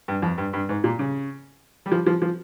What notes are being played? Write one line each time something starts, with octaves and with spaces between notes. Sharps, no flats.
G2
F2
G2
G2
G#2
A#2
C#3
G3
F3
F3
F3